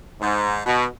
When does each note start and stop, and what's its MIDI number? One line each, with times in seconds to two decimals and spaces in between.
0.21 0.61 44
0.66 0.85 47